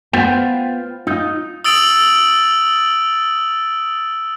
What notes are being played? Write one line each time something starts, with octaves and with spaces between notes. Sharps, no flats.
B3 F4 B4 C5 G5
D#4 F4
D#6 E6 A6 D7 F7 F#7